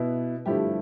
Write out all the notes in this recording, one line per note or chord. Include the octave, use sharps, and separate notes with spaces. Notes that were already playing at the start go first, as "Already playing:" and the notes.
Already playing: B2 B3 E4
G2 D3 F3 A3 E4 G4